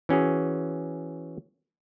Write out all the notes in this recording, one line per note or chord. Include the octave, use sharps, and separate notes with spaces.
E3 C#4 F#4 G#4